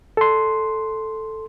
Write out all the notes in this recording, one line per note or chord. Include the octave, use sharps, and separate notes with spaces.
A4 C6